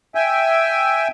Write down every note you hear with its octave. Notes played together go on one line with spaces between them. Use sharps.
E5 G5 G#5